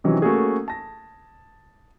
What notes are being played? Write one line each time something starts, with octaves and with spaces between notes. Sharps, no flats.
C3 D#3 E3 F#3 C4 C#4
A3 A#3 C#4 F#4 G#4
A5 A#6